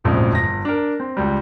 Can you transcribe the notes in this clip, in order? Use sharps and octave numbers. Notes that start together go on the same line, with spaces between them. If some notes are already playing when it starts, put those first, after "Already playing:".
D1 A#1 F2 G#2 C#3
G1 A#6
D4 A#4
C4
C#2 G3